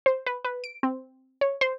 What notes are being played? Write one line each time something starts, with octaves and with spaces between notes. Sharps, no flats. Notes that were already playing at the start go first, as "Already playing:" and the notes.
C5
B4
B4
D7
C4
C#5
C5